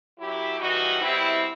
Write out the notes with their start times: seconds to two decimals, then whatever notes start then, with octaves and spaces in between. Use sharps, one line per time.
0.19 F#2 F#3 E4 G4
0.59 F#2 E3 G3 D#4 F#4
1.01 B2 G3 C4 E4